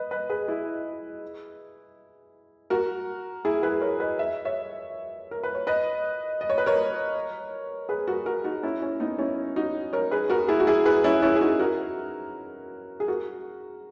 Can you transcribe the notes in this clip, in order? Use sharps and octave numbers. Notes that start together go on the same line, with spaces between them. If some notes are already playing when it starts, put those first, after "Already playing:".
Already playing: B4 D#5
B4 D#5
G#4 B4
E4 G#4
F#4 A#4
E4 G#4
G#4 B4
A#4 C#5
B4 D#5
E5
C#5 E5
A#4
B4
C#5
B4 D#5
D#5
C#5
B4
A#4 C#5
G#4 B4
F#4 A#4
F#4 A#4
D#4 F#4
C#4 E4
C#4
B3 D#4
C#4 E4
D#4 F#4
A#4 C#5
G#4 B4
F#4 A#4
E4 G#4
F#4
E4 G#4
G#4 B4
C#4 E4
C#4 E4
G#4
D#4 F#4
F#4 A#4
G#4
F#4 A#4